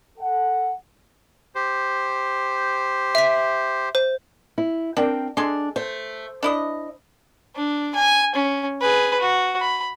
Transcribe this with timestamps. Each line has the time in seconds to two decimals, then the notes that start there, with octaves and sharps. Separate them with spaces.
0.18 A4 F#5
1.55 G4 C5
3.15 E5 B6
3.95 C5
4.58 E4
4.97 C4 D4 A#4 G5
5.37 G#3 D4 A4 C6
5.76 A3 C5
6.43 D4 E4 D#5
7.56 D4
7.95 G#5
8.35 C#4
8.81 G#4 B4
9.20 F#4
9.61 B5